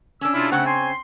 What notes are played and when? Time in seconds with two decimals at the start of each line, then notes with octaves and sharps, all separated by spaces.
0.21 C#4 D4 E6
0.34 C3 G#3 E4 F4
0.52 C#3 A3 C4 F#5
0.66 G#5 C6